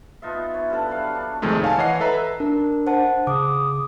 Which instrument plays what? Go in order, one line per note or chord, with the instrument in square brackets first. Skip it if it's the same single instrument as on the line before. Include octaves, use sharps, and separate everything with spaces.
[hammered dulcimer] B3 D#4 F4 E5
E4 C#5
G2 E4 A4 F#5
F#3 B4 E5 F5
D4
[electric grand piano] A#1 F2 C3 D#3 G#3 A3
C#5 F5 G#5 A5
E3 C#5 D#5 F#5 C7
A4 B4 E5 A#5
[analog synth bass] D4 [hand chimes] A#4
[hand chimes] C5 F#5 A5
[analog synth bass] C#3 [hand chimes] D6 [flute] D#6